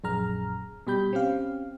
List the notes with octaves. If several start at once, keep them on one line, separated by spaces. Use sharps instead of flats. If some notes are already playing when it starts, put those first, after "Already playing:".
A#1 F#2 G#4 A#5 F6
B2 G3 G4 B5 G6
C4 C#4 G4 F5